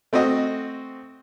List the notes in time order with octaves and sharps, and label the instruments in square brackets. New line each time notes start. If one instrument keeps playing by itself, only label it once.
[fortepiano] A3 C4 F#4 D#5